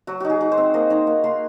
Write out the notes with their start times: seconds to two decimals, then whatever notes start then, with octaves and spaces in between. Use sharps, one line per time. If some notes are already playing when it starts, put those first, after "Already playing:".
0.07 F#3 F#4
0.20 D#4 F#4
0.30 G#4
0.41 D#4
0.52 C5
0.57 C4
0.74 A#3 D#5
0.90 D#4 C#5
1.07 A#3
1.24 A#3 C6